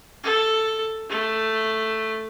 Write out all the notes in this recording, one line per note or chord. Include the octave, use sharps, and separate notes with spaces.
A4
A3